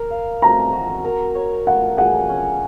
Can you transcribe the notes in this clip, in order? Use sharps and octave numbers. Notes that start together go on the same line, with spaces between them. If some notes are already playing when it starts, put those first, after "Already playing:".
Already playing: A#4
F5
C4 A#5
F#4
A#4
C#5
F4 F#5
G#4 F#5
C#4